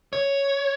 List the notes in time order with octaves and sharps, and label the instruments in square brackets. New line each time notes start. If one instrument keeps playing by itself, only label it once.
[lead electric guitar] C#5